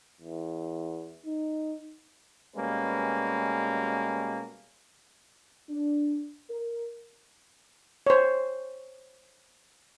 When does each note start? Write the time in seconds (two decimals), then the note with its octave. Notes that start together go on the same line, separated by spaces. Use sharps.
0.21 E2
1.26 D#4
2.56 B2 G3 G#3 A#3 C#4 B4
5.70 D4
6.50 A#4
8.07 C5 C#5